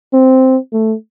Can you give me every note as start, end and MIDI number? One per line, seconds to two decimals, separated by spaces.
0.14 0.57 60
0.73 0.94 57